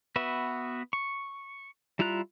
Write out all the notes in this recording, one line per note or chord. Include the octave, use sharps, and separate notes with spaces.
B3 F#4 B4 E5
C#6
G3 E4 F4 A#5 F#6